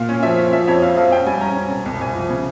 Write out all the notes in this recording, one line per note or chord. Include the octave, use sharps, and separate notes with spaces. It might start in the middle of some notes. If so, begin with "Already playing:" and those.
Already playing: A#2 F5
C#4
F3 E5
C#4
F3 E5
F2 C#5
C4 F5
F2 F5
C#4 G5
G3 G#5
C#4 A#5
C#4
C2
C2
C2 G#5
F3
C#3